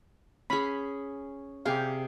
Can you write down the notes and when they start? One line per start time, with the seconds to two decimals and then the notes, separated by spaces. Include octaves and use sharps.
0.50 C#4 G#4 B5
1.66 C3 G4 G#4 F5